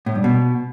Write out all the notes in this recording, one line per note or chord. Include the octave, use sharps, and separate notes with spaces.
A2
G2
B2